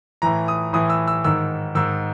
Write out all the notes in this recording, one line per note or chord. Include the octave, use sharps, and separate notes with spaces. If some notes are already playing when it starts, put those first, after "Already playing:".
A2 E3 A#5
D#6
A2 E3 D#6
E6
E6
G#2 D#3 E6
G#2 D#3 E6